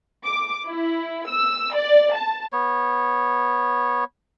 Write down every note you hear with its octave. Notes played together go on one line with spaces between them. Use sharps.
D6
E4
E6
D5
A5
B3 C#5